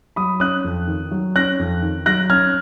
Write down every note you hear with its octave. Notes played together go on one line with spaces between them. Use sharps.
F#3 B5 D#6
C#4 D#6 F#6
F2
D#3
F#3
C#4 F#6 A#6
F2
D#3
F#3 F#6 A#6
C#4 F6 G#6